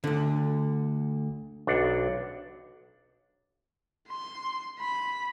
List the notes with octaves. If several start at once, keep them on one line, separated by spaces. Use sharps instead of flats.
D2 D3
B1 D4 F#5
C6
B5